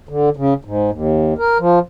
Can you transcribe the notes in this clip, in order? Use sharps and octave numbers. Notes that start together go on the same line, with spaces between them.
D3
C#3
G#2
D#2
A#4
F3